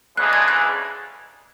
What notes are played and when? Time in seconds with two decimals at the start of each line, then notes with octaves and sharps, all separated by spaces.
0.17 D2 C#3 E3 G#3 D4 F#6
0.33 G#6
0.48 F#6